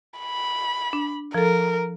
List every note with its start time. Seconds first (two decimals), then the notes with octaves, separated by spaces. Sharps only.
0.20 B5
0.93 D4
1.34 F3 A4 A#4